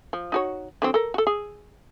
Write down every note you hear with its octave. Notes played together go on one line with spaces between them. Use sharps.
F3
D#4 F#4 C#5
D3 F#3 C4
A4 A#4
F#4 A4
G#4